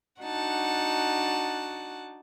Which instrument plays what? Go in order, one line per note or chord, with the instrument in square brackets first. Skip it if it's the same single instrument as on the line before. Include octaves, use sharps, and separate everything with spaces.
[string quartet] D4 D#4 F#4 F#5 A5